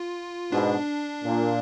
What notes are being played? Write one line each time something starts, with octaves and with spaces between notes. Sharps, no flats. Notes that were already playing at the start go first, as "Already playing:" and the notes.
Already playing: F4
G#2 B2 D4
A#2